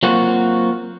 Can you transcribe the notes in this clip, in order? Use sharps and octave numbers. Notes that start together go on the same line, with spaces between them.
F#3 A#3 C4 F4 F#4